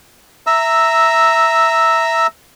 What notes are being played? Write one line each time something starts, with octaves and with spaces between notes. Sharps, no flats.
E5 A#5 E6